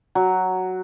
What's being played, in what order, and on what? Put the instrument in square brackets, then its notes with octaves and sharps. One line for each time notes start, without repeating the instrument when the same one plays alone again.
[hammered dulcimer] F#3